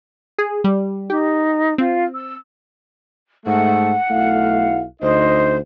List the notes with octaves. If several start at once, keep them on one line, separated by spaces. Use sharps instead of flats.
G#4
G3
D#4 G4
C4 F4
E6
G#2 A3 F#5
B1 A3 E4 F5
D2 D#4 C5 D#5